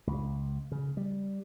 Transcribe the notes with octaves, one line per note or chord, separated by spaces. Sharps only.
C#2
C#3
G3